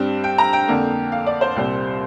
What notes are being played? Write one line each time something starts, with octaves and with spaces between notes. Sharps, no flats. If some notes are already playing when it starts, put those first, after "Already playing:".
Already playing: G2 G3 C4
G5
A#5
G5
F2 D3 A#3
F5
D5
C5
C2 A#2 G3 C4